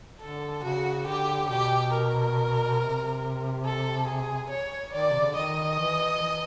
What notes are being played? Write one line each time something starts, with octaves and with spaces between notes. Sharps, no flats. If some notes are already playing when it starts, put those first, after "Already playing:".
D3 A4
C#3 F#4
D3 G4
B2 G4
A#4
C3
A4
G#4
C#5
D#3 D5
C3
C#3
D3
D#3 D#5
E3
E3